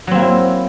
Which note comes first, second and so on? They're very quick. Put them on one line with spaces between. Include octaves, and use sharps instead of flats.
F#3 C4 A#3 E4